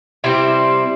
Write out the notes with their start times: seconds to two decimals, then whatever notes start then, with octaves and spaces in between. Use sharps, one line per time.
0.24 C3 G3 C4 E4